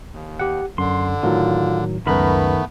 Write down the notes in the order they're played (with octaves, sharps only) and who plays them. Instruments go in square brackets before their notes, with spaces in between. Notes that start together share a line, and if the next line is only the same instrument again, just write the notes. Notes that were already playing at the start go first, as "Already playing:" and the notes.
[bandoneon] D#2
[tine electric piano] G4 F#5
[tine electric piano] F#2 [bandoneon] D3 [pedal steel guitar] C6
[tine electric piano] A2 D#3 F#3 [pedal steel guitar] F4
[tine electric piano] C#2 F#2 B4 [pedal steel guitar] D#3 A#4 B5 [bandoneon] A3 B3